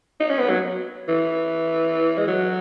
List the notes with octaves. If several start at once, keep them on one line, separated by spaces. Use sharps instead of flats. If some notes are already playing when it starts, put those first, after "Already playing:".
D#4
C#4
B3
F#3
E3
G#3
F#3